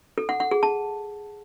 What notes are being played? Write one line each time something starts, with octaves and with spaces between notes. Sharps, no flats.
A4
F#5
F#5
G#4
A5